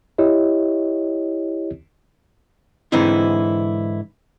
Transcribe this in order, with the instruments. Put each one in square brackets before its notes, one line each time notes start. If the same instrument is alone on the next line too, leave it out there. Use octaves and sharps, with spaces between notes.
[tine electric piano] E4 G4 C#5 D#5
[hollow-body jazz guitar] G#2 D3 E3 C4 D#4 E4